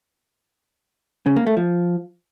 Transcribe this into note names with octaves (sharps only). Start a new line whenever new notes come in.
C#3
A#3
A3
F3